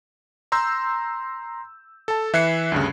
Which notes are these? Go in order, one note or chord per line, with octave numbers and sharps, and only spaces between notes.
A#5 C6 E6 G6
A4 A5
E3 E5 F#6 G#6 C7 C#7
D2 G2 C#3